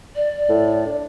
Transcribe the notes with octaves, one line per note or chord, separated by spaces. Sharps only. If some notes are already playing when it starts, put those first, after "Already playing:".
D5
A2
D4